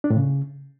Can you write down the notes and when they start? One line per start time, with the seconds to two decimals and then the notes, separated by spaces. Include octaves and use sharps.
0.04 D4
0.10 A2
0.17 C#3